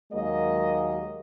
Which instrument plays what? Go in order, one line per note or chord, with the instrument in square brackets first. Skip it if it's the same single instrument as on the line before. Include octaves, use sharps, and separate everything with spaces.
[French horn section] D#2 F#3 G#3 A#3 D#5